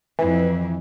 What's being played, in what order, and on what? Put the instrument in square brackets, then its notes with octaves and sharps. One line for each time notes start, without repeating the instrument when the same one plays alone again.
[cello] F2 [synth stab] E3